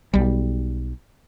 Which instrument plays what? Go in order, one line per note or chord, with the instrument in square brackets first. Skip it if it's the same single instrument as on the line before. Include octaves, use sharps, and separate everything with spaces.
[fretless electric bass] B1 G3